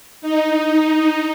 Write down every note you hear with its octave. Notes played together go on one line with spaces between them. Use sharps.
D#4